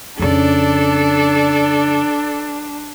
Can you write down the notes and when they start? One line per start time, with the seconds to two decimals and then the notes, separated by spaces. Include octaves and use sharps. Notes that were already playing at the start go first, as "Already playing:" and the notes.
0.19 F2 C#3 D4 A4 D5